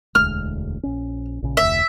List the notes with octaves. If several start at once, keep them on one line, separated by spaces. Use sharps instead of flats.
E1 D2 G#3 F6
A#1 C#4
A#1 C#3
F1 D2 E5